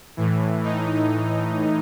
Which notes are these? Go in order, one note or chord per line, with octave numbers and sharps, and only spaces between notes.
A2 E3
A2 E3 D#4